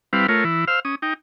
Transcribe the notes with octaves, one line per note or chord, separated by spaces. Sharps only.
G3 C4 E4 B4 F5
A3 F4 A#4 C#5
E3 E4
C5 F5 E6 F6
C#4 D#6
D#4 G5